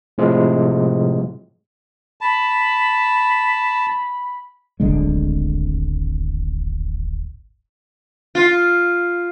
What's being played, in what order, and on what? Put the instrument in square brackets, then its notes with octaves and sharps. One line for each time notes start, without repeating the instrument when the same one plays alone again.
[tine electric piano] A2 C3 F3 G#3
[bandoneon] A5 [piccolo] B5
[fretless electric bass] D1 G#1 D3 G#3
[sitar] F4